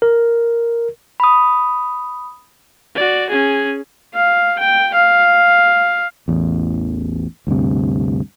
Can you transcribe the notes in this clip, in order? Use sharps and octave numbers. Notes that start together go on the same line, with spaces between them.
A#4
B5 D#6
F#4 D5
C#4 G#4
F5
G5
F5
A1 E2
D2 G2 C3